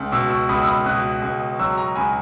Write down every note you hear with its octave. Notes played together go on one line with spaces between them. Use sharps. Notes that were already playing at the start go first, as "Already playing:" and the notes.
Already playing: C#2
B2 C#6 E6
C#6 E6
C#2 B5 D#6
E6
B5 D#6
B2 D#6 F#6
C#2
F#3 C#6 E6
A#5 C#6
C#2 G#5 B5